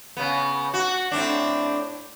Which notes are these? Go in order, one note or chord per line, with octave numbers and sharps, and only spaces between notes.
C#3 B3
F#4
A2 C4 D4